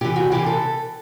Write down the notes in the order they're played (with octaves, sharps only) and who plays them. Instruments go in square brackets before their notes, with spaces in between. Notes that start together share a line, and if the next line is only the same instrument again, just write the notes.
[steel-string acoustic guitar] C3 E3 G4
F#4
C3 E3 G4
A4